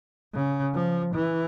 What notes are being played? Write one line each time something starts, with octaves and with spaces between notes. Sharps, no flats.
C#3
F3
E3